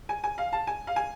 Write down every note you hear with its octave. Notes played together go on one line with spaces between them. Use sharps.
G#5
G#5
F5
A5
G#5
F5
G#5